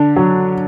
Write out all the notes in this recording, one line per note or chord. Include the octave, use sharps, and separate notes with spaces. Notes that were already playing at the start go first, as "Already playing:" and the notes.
Already playing: D3 D4
F#3